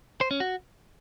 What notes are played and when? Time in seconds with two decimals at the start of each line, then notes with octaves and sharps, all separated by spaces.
0.21 C5
0.31 C#4
0.40 F#4